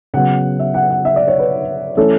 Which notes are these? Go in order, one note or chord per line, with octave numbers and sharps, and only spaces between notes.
C#3 F#3 B3 F#5
E5
F#5
F#5
E5
D5
C#5
B4
E3 A3 C#4 E4 A4